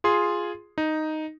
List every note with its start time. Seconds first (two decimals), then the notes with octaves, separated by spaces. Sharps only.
0.04 F4 G#4 C6
0.78 D#4